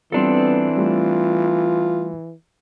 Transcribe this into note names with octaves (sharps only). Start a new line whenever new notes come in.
E3 G3 B3 C4 D4 F4 A4
G3 A3 F4